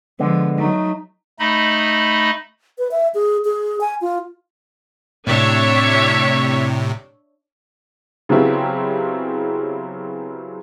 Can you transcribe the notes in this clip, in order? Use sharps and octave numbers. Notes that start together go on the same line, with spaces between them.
D3 F3 G#3 B3
F#3 A3 D#4
A3 D#4 D#5 B5
B4
E5
G#4
G#4
G#5
F4
A2 C3 D4 C#5 E5
C#3 F#3 B3 C4 E4 G4